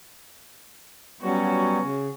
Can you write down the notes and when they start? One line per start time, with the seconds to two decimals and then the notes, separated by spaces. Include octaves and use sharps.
1.21 F#3 G3 B3 C#4 F#4
1.81 C#3